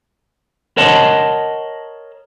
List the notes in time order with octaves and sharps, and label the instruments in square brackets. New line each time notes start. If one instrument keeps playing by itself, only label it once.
[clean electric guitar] A#4 C#5 D#5 F#5 A5 C6